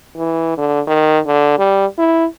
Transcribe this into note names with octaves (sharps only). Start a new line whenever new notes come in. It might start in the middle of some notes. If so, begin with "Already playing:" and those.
E3
D3
D#3
D3
G3
E4